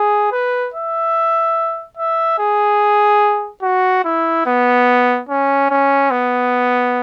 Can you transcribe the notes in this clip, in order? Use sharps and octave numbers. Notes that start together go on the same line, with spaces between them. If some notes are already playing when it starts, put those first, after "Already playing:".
Already playing: G#4
B4
E5
E5
G#4
F#4
E4
B3
C#4
C#4
B3